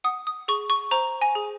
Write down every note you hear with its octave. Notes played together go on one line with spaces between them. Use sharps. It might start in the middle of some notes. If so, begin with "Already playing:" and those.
F#5 D#6
D#6
G#4 C#6
C#6
C5 A#5
G#5
G#4